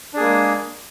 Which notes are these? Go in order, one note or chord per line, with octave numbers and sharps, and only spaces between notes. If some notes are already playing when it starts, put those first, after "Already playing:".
G#3 A#3 D4 G#4